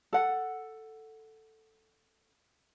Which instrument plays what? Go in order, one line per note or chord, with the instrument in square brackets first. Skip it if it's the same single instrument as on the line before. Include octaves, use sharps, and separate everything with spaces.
[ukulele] A4 F#5